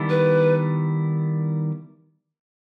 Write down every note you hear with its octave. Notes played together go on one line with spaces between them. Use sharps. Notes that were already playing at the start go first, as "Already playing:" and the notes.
Already playing: D#3 G3 B3 E4 A4
B4